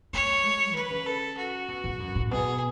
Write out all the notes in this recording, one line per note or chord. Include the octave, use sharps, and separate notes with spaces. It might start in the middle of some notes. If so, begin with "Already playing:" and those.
A3 C#5
G#3
D3 B4
C#3
A4
F#4
B2
G#2
F#2
A2
B2 G#4